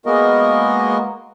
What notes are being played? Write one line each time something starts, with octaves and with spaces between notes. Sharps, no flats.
G#3 A#3 B3 F#4 A#4 D#5